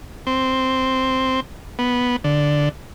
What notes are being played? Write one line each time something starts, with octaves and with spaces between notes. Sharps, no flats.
C4
B3
D3